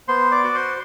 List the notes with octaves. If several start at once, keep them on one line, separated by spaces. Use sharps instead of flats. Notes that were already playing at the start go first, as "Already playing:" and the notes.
B3 C5 C6
D5 D6
F#4
C5 C6